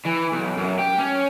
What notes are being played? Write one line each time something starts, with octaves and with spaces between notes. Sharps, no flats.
E3
B1
F#2
G4
C#4